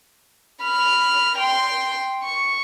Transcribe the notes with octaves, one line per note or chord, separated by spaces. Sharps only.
B5 F6
G5 C6
C#6